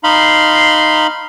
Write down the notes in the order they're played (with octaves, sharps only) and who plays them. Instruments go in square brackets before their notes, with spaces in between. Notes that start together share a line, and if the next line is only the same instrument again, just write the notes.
[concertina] D#4 F5 B5 C6